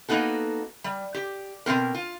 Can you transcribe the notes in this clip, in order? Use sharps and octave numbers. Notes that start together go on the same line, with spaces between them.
A#3 B3 D#4 F#4 A4
G3
G4
B2 G#3 C4 A#4
F4